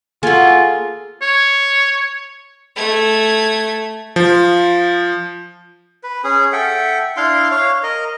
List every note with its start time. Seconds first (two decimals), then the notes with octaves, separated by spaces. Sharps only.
0.23 A#3 F4 F#4 G#4 A4 G#5
1.21 C#5
2.76 A3 G#6
4.16 F3
6.03 B4
6.24 C#4 G#4
6.52 A4 E5 F#5 G5
7.17 D4 E4 F5 C6
7.51 C#5 F5
7.83 A#4 D#5